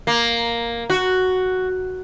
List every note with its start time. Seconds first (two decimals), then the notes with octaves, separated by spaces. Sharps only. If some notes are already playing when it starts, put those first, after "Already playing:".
0.07 A#3
0.90 F#4